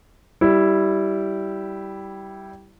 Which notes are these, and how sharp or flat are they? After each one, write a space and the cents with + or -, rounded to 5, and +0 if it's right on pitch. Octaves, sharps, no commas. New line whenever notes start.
G3 -10 E4 +0